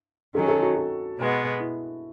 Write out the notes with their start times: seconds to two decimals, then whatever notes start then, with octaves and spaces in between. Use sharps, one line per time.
0.35 D#3 F#3 C#4 A4
0.48 A4
0.62 F#4
0.76 F#4
1.18 B2 G#3 B3
1.60 E4